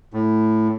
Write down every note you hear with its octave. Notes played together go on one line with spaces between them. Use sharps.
A2